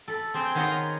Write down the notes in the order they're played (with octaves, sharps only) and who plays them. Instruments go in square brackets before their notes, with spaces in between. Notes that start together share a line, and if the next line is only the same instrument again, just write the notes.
[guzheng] A4 B5
C4 G#4 C5 G5
D#3 B3 F4 C#5 A#5 C6